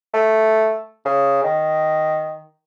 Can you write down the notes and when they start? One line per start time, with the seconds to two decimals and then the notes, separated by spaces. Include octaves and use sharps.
0.14 A3
1.05 C#3
1.44 D#3